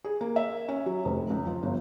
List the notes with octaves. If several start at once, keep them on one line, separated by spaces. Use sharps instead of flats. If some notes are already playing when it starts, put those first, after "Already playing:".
G#4
A#3
E5
C#4
F#3
F1
C#2
F3
G1